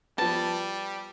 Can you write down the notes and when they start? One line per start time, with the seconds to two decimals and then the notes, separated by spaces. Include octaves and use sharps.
0.18 F3 G3 B3 A5